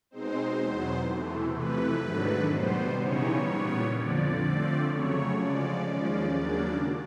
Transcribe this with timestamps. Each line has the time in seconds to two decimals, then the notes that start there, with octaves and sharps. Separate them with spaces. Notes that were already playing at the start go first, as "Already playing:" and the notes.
0.11 B2 G#3 C4 D#4 C5
0.58 E2 B2 F#3 B3
1.06 C3 E3 A3
1.54 F2 C3 E3 A3 B4
2.02 G#2 D#3 F#3 A3 D4
2.49 B2 G3 B3 C5
2.98 C#3 E3 G3 B3 D#4 C#5
3.45 A#2 G3 B3
3.93 F2 D3 F3 D5
4.41 D3 F3 A3 C4
4.89 C#3 F#3 A3 C#5
5.36 C#3 F3 G#3 D5
5.84 D#2 C#3 F3 G#3 C#4 D5
6.32 D#2 C#3 F#3 A#3 D4